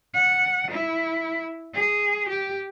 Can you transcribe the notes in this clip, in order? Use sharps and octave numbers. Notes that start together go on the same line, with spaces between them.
F#5
E4
G#4
G4